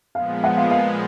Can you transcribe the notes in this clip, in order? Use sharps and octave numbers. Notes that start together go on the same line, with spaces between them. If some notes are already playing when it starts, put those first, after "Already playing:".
A#2 F3 G#3 B3 F5
F#5
F5
F5